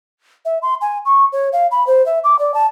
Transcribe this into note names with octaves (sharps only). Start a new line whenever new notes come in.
E5
C6
G#5
C#6
C#5
F5
B5
C5
E5
D6
D5
A5